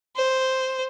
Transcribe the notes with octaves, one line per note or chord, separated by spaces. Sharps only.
C5